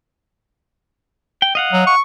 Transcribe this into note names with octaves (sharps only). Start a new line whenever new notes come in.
G5
D#5 F5 F#5
F#3
C#6